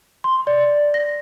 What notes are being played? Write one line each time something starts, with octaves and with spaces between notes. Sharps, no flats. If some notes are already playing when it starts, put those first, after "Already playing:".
C6
D5
A#6